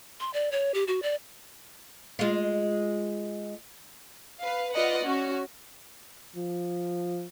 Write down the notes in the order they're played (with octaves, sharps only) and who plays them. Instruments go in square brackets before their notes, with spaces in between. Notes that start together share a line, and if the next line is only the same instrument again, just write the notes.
[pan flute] C6
D5
C#5
G4
F#4
D5
[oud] G#3 F4
[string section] B4 F5
F4 B4 D5 D#5 F#5
C#4 F#4
[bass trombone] F3